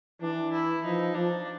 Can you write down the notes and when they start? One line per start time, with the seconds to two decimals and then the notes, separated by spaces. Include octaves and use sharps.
0.21 E3 D4
0.52 E4
0.83 F3 D#4
1.14 F3 D4